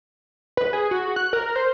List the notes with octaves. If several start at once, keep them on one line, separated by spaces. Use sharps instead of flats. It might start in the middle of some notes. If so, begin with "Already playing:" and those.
B4
G#4
F#4
F#6
A#4
C5